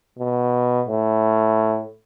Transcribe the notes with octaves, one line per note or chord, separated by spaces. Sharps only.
B2
A2